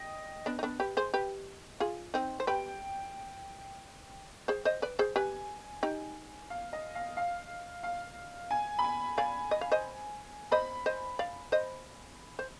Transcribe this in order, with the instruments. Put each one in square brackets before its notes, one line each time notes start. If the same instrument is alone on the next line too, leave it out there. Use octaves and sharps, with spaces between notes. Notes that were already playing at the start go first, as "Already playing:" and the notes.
Already playing: [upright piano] D#5 G5
[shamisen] B3 D4
D#4
B3 D4
G4 B4
G#4 C5
G4 B4
F4 G#4
C4 D#4
C5
[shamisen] G4 B4 [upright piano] G5
[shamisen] G#4 C5
C5 D#5
B4 D5
G#4 C5
[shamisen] G4 B4 [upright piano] G#5
[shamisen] D#4 G4
[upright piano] F5
D#5
F5
F5
F5
G#5
B5
G#5
[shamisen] D5 F5 [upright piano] G#5
[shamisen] D#5
F5
C5 D#5
[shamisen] C5 D#5 [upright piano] B5
[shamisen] C5 D#5
D5 F5
C5 D#5
C5